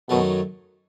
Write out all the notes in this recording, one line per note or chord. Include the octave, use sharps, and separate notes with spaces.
F#2 B2 D#3 F#3 A3